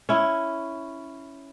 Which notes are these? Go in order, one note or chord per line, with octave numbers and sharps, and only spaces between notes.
C#4 E4